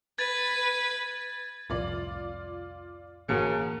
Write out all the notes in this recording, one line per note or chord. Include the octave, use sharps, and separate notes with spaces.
B4 G#6 A6
C2 F2 A2 F4 D5
G1 A2 C#3 E3 A#3 F#4 A5 C#7